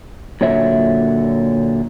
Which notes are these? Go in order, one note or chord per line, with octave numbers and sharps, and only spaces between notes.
A#2 D3 F#3 C#5 E5